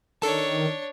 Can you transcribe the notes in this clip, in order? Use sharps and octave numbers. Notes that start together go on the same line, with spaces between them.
D#3 D4 A4 C#5 A5